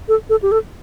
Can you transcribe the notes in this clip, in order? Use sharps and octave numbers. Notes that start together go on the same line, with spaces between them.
A4
A4
G4
A4